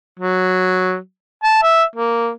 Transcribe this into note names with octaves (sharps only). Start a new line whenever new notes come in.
F#3
A5
E5
A#3